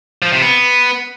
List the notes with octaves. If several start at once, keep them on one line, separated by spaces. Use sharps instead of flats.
F3
C3
B3